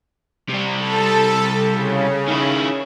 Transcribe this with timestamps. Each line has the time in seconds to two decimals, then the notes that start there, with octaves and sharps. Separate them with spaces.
0.49 C3 G3
0.79 A4
1.74 C#3
2.28 D#3 E4